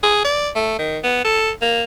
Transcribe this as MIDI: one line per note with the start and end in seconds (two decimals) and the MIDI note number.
0.03 0.24 68
0.25 0.49 74
0.56 0.75 57
0.79 0.98 51
1.03 1.20 59
1.24 1.51 69
1.61 1.84 58